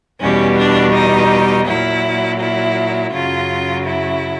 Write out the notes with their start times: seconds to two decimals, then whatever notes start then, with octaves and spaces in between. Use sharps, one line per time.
0.20 E2 B2 G3 C#4
0.56 D4
0.93 D#4
1.66 A#2 F#3 E4
2.39 E4
3.12 F#2 C#3 F#3 F4
3.84 E4